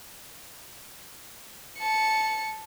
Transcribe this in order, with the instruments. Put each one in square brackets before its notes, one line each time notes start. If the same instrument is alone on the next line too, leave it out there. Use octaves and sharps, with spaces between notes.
[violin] A5 C#7